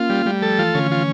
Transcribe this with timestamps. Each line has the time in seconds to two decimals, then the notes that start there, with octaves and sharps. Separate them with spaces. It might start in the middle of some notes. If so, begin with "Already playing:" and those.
Already playing: A#3 C#4 F4
0.10 G3
0.26 G3 A3
0.42 F3 A4
0.59 E3 F4
0.75 D3 C#4
0.91 E3 F4